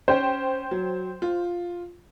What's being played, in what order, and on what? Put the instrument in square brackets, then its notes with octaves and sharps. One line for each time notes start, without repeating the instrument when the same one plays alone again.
[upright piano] C#4 [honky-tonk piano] C5 G5
[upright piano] F#3
F4